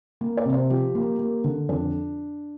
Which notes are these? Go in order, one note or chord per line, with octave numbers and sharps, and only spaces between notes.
A#3
D5
C3
C5
F3 G4
A#3
A#3
D3
F2 D4